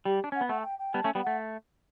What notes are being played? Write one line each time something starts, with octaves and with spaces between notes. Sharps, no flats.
G3 G4
D4
C#4 F#5
B3
A3 F#5
A5
G5
G5
G3 B3 A5
A3 C#4
G3 B3
A3 F#5